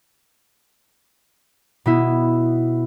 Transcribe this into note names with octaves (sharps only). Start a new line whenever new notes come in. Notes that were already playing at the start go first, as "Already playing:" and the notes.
B2 B3 E4